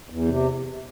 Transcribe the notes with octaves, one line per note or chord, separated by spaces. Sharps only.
E2
C3